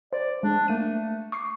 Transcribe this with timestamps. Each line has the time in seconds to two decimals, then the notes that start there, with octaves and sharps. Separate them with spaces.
0.13 C5 D5
0.43 G#3 D4
0.68 A3 A#3 D#7
1.32 C#6 D6 C7